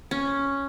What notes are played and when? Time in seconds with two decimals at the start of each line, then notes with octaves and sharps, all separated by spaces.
0.11 C#4